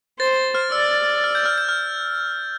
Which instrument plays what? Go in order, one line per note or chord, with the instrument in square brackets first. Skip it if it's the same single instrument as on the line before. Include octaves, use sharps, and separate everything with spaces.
[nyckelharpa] C5 [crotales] A6
[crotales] F6
[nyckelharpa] D5 [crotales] E6
[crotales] F6
G6
F6
G6
F6